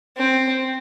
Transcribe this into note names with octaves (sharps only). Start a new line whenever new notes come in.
C4